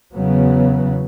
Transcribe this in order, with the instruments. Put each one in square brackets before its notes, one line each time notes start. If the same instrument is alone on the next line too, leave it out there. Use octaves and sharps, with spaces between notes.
[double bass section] E2 C#3 F#3 B3